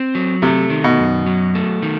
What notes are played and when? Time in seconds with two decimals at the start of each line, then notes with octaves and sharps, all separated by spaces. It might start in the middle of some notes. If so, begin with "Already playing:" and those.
Already playing: C4
0.15 F#3
0.42 C3 A3
0.70 D#3
0.84 B2
0.99 F#2
1.26 F#3
1.55 A3
1.82 D#3